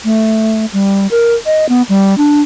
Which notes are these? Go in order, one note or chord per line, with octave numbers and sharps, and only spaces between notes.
A3
G3
A#4
D#5
B3
G3
D4